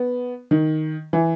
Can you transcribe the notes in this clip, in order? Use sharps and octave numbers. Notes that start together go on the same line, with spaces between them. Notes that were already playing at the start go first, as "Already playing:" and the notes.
Already playing: B3
D#3
E3